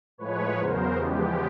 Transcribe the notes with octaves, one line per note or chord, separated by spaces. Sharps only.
A2 F3 G#3 B4 C#5
E2 C#3 F#3 B3 A#4 C5
E2 C#3 F3 G#3 B3 G4